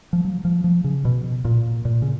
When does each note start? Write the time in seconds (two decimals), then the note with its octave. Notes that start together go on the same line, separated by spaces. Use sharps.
0.13 F3
0.25 F#3
0.45 F3
0.64 F3
0.84 C#3
1.05 B2
1.45 A#2
1.85 A#2
2.02 C#3